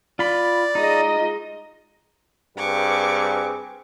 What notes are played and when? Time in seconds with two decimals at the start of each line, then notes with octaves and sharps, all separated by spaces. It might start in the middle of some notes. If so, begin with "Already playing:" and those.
0.19 F4 D5 B5
0.75 G#3 D#4 F4 D#5
2.57 G2 C4 G#4 B4 C#6 D6